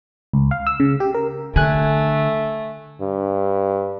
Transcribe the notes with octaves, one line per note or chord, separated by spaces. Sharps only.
C#2
F5
E6
C#3
G4
A#4
D3 A3 G#5 F#6
G2